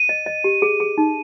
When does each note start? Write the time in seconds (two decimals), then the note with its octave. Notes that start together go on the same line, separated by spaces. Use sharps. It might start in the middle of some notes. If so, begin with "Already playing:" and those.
Already playing: D#7
0.09 D#5
0.26 D#5
0.44 G4
0.62 G#4
0.80 G#4
0.98 D#4